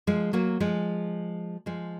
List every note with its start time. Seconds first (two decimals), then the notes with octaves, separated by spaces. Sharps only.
0.07 F3 G#3
0.33 F#3 A#3
0.60 F3 G#3
1.66 F3 G#3